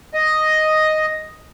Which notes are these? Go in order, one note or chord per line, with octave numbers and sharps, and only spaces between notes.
D#5